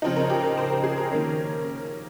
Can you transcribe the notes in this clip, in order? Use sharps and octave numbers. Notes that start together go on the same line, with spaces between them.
C#3 F3 C4 D#4
A#4
G4
A#4
C5
A#4
G#4
A#4
D#3 A#3 C#4